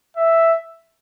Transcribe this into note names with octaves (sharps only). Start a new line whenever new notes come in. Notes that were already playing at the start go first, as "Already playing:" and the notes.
E5